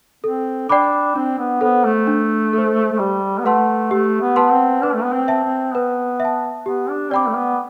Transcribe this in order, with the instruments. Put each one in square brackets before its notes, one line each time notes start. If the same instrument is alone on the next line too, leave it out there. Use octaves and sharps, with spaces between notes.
[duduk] C4 [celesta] A4
[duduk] D4 [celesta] D5 G5 B5 D6
[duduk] C4 [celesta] D4
[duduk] B3
[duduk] B3 [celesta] A4 C5
[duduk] A3
[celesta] D4
A4 C5
[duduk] A3
[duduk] G3 [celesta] G4
[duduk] B3
[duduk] A3 [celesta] B4 F#5 A5 C6
[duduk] A3 [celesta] G4
[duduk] B3
[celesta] B4 F#5 A5 C6
[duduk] C4
[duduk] D4 [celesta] B4
[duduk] A3
B3
C4
[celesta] E5 A5
[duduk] C4
[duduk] B3 [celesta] B4
[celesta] E5 A5
[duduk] B3 [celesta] G4
[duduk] D4
[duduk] C4 [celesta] D5 G5 B5 D6
[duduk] A3
B3